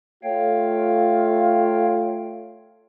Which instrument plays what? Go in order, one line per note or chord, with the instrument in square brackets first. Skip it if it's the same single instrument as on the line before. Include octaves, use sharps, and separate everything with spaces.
[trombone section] A3 F4 [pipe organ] C#5 F5 G5